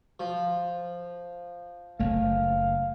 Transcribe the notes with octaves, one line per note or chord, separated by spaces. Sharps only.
F3
F#1 A3 F5